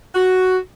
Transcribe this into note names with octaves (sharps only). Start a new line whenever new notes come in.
F#4